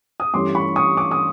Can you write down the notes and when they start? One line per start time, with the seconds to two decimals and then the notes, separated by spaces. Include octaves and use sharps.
0.20 D#6
0.34 G2 E3 A3 C#4 C6 D6
0.55 B5 C#6
0.76 C#6 D#6
0.97 D6
1.11 D#6